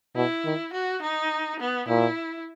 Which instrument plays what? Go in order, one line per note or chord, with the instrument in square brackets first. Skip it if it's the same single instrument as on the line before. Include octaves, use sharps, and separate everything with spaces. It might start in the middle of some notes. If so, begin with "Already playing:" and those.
[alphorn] B2 [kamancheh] E4
[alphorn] D#3
[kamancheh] F#4
D#4
B3
[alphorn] A#2 [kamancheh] E4